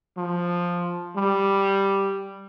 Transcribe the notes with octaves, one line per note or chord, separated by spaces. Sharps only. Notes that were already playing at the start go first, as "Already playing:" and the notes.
F3
G3